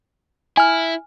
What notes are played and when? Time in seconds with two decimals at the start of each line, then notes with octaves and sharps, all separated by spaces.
0.57 E4 G#5 F6